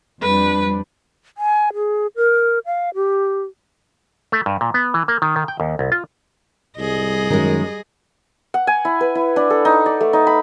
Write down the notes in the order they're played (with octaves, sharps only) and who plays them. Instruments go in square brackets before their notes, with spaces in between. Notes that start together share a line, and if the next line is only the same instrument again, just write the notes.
[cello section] F2 G3 D4 [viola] B4
[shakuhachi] G#5
G#4
A#4
F5
G4
[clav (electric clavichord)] A3
G2
A#2
B3
E3
A#3
D#3
D#3
G5
D#2
C2
F4
[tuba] C2 [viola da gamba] G3 G#4 D#5
[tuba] F#2 [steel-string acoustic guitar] D#3 G#3
[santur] F#5
G#5
E4
B4
E4
D4
A4
D#4
D5
A3
D#4
B5